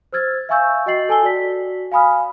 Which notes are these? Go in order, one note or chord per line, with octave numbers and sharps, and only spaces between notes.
C5 E6 F6 G#6 A6
E5 F5 G#5 C#6 E6 G6
F#4 D#5 G5 A6 C7 F#7
A4 G#5 A5 E6 G7
F#4 D5 B6
F5 G#5 B5 D#6 F6